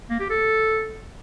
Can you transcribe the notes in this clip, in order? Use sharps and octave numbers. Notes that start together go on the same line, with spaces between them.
A#3
G4
A4